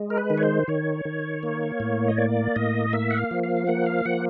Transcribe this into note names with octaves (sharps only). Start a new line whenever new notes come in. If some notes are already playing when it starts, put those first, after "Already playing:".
Already playing: G#3
A#4
B4
D#3
C#5
C5
D#3 C#5
D#3
A#3
A2
D#5
A#3 D5
A2 D#5
A#3 E5
F#5
F5
F3
F5
A#3 F#5
F5
F3 F#5